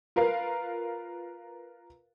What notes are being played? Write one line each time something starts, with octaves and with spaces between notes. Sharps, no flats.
F4 A#4 B4 F5